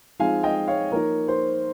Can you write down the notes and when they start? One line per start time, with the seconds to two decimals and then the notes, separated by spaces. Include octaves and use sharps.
0.19 F3 G#3 C4 D#4 F5 G#5
0.43 D#5 G5
0.67 C#5 F5
0.91 F3 A#3 D#4 A#4 C#5
1.28 C5